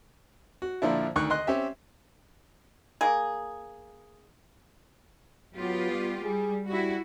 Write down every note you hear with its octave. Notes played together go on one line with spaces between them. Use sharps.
F#4
A#2 D3 F3 D4 E4
D2 D#3 C#6 F#6
D#5 C6 F#6
C4 C#4 G4 E5
A#3 G#4
F#3 B3 F4 G4
G3
G3 G#4
G3 E4 F#4